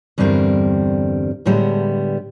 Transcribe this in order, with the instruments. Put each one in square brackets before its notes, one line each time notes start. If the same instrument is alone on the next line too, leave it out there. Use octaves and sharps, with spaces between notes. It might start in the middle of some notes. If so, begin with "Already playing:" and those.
[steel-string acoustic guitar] E2 G2 D3 G3 C4 A#4
A2 D3 G3 G#3 B3